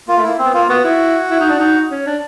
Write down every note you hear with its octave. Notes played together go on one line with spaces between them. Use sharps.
A#3 F4
A3
A#3 E4
C4
B3
A#3 F4
B3 F#4
E4
E4
D#4
D4
D#4
C#4
D4